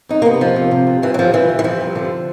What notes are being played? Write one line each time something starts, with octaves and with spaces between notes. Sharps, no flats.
F2 D#4
A#3
C3 B3
F2 F3
C3
C3
F2
G2 E3
F#3
D3 F3
G2 E3
G2
E3
D3 F3
G2
D3